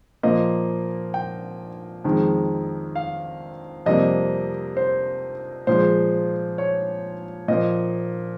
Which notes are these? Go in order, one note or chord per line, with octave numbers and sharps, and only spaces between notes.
A#2 F3 A#3 D#5
G5
F2 D#3 G#3
F5
F2 C3 G3 A#3 D#5
C5
A#2 F3 G#3 C5
C#5
A#2 F3 A#3 D#5